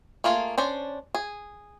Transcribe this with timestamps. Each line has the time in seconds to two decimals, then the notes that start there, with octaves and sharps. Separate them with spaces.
0.24 A3 A#3 F4 G#4
0.58 C#4 D4 C5
1.14 G#4